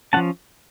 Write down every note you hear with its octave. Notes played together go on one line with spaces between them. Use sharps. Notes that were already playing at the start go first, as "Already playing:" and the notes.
F3 A3 C#4 F#5 A5